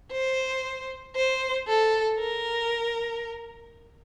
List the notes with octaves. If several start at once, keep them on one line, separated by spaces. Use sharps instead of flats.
C5
C5
A4
A#4